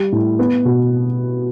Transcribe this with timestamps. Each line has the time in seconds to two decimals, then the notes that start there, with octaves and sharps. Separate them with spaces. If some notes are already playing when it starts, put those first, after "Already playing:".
Already playing: G3
0.12 A2
0.39 B3
0.65 B2